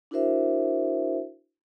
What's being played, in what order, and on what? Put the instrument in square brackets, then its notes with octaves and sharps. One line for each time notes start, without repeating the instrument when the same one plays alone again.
[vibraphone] D4 E4 F#4 A#4 C5 E5